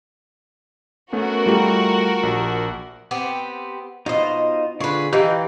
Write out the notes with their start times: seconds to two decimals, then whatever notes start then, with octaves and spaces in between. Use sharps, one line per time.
1.13 A3 B3 C#4 F#4 A#4
1.46 G3 A3 F4 G4
2.23 A#1
3.11 B3 C4 G4
4.06 B2 D#4 F4 C5 D#5
4.80 D3 F4 G#4 B4 C#6
5.13 E3 D#4 G4 B4 F5 G5